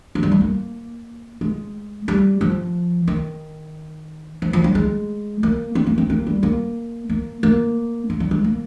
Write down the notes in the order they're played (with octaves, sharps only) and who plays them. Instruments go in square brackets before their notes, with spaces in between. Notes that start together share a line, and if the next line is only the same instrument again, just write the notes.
[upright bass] F3
G3
G#3
A#3
G#3
G3
F3
D#3
F3
F3
G3
G#3
A#3
C4
A#3
C4
A#3
G3
A#3
A#3
A#3
G#3
G3
G#3
A#3